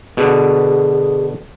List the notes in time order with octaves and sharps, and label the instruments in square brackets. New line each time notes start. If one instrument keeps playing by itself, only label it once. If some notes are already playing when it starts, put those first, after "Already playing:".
[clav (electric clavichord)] B2 D3 [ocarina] G#4